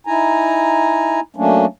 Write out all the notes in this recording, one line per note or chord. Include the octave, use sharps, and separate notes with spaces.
D#4 E4 G#5 A#5
F#3 A3 A#3 C#4 D4